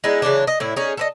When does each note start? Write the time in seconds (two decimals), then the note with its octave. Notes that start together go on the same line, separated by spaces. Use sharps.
0.04 G#3 B3 D#4 E4
0.22 C#3 E3 F#3 D4
0.47 D#5
0.60 A2 E4
0.76 C#4 D#4 G#4
0.97 A4 B4 D#5